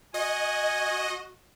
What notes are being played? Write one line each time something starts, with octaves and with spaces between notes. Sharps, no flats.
F#4 D#5 G#5